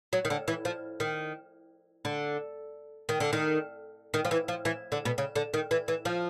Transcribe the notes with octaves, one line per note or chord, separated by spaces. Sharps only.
F#3
D#3
D3
E3
F3
D#3
D3
D#3
D3
D#3
D#3
F3
E3
F3
E3
D3
B2
C#3
D3
D#3
E3
E3
F3